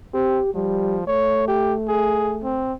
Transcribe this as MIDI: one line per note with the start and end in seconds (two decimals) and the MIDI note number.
0.14 0.41 60
0.14 0.50 67
0.54 1.05 53
0.54 0.98 55
1.07 2.65 57
1.07 1.47 73
1.48 1.74 67
1.88 2.38 68
2.43 2.73 60